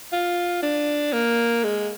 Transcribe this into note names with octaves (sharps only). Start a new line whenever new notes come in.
F4
D4
A#3
G#3